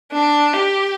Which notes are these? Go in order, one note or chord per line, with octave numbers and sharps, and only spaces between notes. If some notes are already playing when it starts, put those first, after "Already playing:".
D4
G4